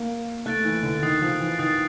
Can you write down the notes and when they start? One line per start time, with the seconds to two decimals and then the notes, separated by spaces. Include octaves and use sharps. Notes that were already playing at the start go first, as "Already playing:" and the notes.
Already playing: A#3
0.46 A3 F#6 A6 D7
0.65 E3
0.83 D3
1.03 D#3 D#6 F#6 A6 C7
1.22 F3
1.40 E3
1.59 D#3 D#6 F#6 A6 C7